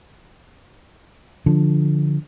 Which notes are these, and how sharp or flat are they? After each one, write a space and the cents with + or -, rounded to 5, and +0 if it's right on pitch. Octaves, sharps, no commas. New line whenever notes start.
D3 +0 F3 +0